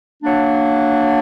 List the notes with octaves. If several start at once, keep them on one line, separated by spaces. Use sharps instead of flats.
F#3 A#3 D4